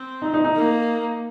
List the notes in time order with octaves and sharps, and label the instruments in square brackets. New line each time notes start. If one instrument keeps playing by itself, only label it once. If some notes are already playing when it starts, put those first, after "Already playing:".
Already playing: [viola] C4
[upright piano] D#4
D#4
D#4
[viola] A#3